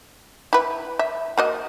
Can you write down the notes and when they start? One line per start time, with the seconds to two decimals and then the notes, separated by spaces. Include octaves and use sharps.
0.53 E4 B4
0.99 E5
1.38 A#3 F#4 D#5